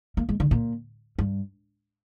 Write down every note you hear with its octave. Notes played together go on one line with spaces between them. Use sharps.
A#3
G#3
D3
A#2
G2